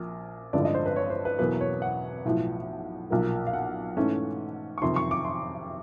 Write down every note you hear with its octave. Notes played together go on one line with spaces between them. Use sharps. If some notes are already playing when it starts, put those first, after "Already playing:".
Already playing: A#1 A#2 F3
A1 G2 D3 F3 G#3 D5
D#5
C5
B4
C#5
C5
B4
E2 B2 F#3 A#3 B4
C#5
F#5
B1 A2 F3
B1 A#2 F3 A#3
F5
F#5
G#2 E3 A3 C#4
C#6
F#1 F2 C3 D#3 C6
C#6
D6
C6